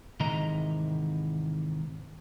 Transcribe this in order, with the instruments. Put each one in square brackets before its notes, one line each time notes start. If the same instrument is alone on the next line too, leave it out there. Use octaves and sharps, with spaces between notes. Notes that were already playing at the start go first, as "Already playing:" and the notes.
[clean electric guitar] G#2 C3 D#3 E3 D#5 A#5